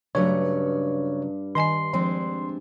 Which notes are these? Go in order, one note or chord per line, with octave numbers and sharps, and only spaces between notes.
G2 C#3 F#3 A3 C#5
D#3 D#5 G#5 C6 C7
F3 G#3 C4 D4